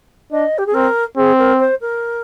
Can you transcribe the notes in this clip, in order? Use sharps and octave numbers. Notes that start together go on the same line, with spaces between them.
D4 D#5
G4
G#4
C4 A#4
C4 G#4
A#4
C5
A#4